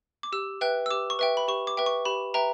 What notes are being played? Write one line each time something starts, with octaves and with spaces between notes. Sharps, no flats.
D6
G4 E6
B4 E5 G5 F#6
E6
G4 D6
C#6
B4 E5 G5
B5
G4 C#6
D6
B4 E5 G5
C#6
G4 B5
B4 E5 G5 A#5